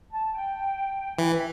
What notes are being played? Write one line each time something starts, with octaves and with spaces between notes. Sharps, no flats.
A5
G5
E3 G5
E5